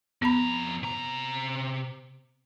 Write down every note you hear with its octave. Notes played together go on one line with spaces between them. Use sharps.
F2 B3 A#5 B5
C3 A#5